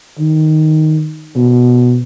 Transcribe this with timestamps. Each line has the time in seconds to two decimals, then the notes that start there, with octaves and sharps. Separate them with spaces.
0.19 D#3
1.36 B2